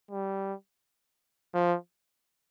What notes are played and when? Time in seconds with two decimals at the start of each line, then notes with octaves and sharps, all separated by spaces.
0.11 G3
1.54 F3